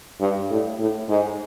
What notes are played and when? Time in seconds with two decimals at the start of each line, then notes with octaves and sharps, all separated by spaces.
0.21 G2
0.50 A2
0.79 A2
1.09 G#2